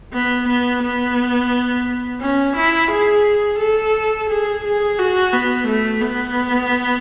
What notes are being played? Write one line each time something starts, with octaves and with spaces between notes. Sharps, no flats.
B3
B3
B3
C#4
E4
G#4
A4
G#4
G#4
F#4
B3
A3
B3